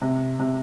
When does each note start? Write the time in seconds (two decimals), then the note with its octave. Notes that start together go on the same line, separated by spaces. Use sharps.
0.02 C3
0.39 C3